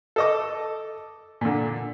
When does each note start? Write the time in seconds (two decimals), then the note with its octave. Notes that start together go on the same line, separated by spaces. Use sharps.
0.16 A4 D#5 D6
1.41 A#2 D3